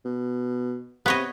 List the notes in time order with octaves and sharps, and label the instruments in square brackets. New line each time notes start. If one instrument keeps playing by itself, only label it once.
[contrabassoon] B2
[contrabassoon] C3 [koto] B3 C#5 D#5